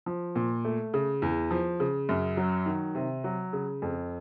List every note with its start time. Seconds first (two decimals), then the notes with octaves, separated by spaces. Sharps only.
0.06 F3
0.36 A#2
0.65 A3
0.94 C#3
1.22 E2
1.51 F3
1.80 C#3
2.09 F#2
2.37 F#3
2.66 D#3
2.95 C3
3.24 F#3
3.53 C#3
3.82 F2